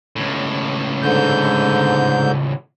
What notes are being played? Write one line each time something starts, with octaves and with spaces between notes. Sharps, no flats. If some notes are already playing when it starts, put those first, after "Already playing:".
C#2 A2
G#2 D3 G6